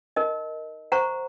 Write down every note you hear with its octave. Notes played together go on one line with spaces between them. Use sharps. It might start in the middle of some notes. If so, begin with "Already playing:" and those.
D#4 A#4 D#5
C5 F#5 A#5 C#6